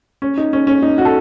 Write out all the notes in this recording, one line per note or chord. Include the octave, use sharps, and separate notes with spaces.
C#4
D#4
C#4
C#4
D#4
F#4
A4